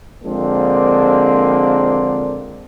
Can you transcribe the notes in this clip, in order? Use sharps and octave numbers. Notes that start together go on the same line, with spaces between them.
D3 F3 G#3 A#3 C4 D4